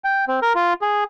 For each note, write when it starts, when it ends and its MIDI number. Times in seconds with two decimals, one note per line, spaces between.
0.04 0.25 79
0.28 0.40 60
0.42 0.53 70
0.55 0.73 65
0.81 1.04 68